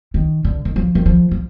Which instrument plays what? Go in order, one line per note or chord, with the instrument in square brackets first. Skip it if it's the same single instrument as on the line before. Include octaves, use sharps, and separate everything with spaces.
[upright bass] D#3
D3
D#3
F3
D#3
F3
F3